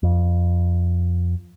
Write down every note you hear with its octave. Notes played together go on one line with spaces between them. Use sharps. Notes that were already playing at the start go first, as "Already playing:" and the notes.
F2